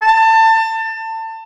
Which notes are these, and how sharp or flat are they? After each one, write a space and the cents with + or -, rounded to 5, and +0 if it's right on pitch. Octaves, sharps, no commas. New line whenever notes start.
A5 +25